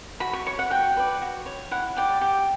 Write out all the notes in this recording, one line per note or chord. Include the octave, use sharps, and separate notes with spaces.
F#4 B5
C#6
C#5 C#6
F#5
F#4 G5
B4 D5
F#4
C#5
E4 F#5
G4 D5
G4